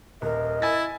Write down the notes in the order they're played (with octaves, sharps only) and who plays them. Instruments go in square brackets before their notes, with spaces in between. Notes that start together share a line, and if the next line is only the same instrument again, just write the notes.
[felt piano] D#1 [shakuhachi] A#4 [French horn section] D#5
[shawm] E4 [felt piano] G#5 A6